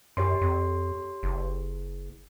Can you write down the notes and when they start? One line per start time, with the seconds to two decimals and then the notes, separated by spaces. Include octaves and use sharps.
0.17 F#2 G4 C#5 C6
0.41 F2
1.23 F#1